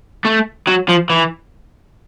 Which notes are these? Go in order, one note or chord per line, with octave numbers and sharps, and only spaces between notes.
A3
F#3
F3
E3